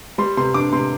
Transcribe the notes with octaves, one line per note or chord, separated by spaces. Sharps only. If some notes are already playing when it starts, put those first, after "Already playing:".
G3 C6
C3 C6
D4 D6
C3 C6